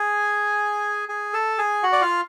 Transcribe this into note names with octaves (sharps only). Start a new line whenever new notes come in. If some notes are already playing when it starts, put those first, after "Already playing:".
Already playing: G#4 G#5
G#4 G#5
A4 A5
G#4 G#5
F#4 F#5
D5
F4 F5